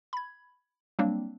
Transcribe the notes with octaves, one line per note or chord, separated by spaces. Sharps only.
B5 G#6
F#3 G3 A#3 C4 D4